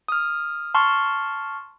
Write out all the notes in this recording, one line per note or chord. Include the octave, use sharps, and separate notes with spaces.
D#6 F6
A5 C6 C#6 F6